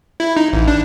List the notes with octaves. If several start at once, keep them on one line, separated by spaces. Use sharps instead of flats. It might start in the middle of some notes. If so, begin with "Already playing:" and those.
E4
D#4
A1
D4